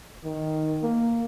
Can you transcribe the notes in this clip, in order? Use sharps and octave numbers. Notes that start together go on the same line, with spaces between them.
D#3
A#3